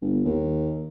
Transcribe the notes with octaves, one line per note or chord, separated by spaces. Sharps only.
G1
D#2